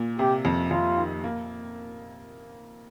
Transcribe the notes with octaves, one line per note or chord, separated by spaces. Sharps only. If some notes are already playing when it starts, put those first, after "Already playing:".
Already playing: A#2
C3 G4
F2
F2 F4
D#3
A#3